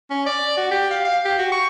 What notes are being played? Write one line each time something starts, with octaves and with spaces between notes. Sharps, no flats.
C#4
D5
F#4
G4
F5
F5
G4
F#4
C#6